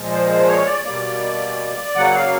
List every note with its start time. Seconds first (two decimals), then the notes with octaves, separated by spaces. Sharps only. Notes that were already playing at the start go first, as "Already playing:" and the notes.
Already playing: A#2 F3 G#3
0.11 C5
0.30 C5
0.48 C#5
0.66 D5
0.85 B2 G3 A#3 D5
1.96 C#3 F#3 A#3 F#5
2.15 F5